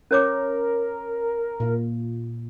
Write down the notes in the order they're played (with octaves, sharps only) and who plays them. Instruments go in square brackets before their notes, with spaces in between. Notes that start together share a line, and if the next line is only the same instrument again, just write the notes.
[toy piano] C#4 C#5 D6 [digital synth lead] A#4
[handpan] A#2